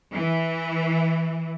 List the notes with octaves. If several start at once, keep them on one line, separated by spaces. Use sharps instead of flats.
E3